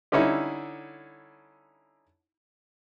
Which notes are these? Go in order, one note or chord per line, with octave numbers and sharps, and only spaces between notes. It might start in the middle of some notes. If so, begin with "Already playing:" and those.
D3 G3 C#4 D#4 E4